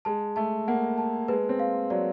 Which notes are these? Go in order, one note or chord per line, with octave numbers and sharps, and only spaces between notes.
G#3 A5
A3 A5
A#3 F#5
A5
G#3 B4
C4
F5
F#3 D5